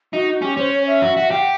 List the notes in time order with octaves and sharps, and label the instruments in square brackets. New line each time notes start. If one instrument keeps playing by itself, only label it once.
[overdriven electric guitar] D#4 [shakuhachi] F#4
[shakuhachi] F#4
[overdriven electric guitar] C#4 [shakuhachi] G4
[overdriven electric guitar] C#4 [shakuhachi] C5
[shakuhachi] C#5
E5
[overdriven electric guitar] F#4
F#4
[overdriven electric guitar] G4 [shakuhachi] F5
[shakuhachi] F#5